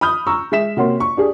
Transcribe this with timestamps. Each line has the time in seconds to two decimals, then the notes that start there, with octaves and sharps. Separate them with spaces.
0.01 B5 D#6 F6 G6
0.27 A#5 C#6 E6
0.52 G#3 E5 B6 E7
0.77 C3 A#3 F#4 C#5 C6
1.00 C#6
1.17 D4 G4 G#4